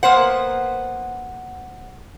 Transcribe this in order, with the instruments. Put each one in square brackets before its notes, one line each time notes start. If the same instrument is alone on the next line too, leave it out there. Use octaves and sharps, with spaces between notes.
[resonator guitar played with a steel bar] A#3 B3 C5 F#5